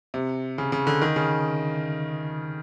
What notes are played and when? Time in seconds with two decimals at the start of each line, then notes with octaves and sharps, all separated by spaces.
0.14 C3
0.58 C#3
0.72 C#3
0.87 D3
1.02 D#3
1.16 C#3